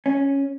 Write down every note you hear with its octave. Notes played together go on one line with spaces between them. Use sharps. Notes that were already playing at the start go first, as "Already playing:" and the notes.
C#4